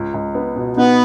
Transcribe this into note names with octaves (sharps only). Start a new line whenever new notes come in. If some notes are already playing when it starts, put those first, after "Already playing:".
Already playing: C#2
C#2
B3
B2
B3 D#4